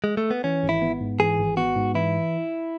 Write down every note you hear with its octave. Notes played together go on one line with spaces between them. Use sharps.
G#3
A3
B3
E3 C#4
G#1
E4
B3
G#2
E3 G#4
G#1
B3 F#4
G#2
E3 E4